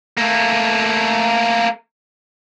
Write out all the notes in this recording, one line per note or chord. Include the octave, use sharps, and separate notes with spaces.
A3 A#3